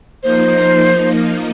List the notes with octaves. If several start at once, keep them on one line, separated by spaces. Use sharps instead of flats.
F3 A#3 D#4 C5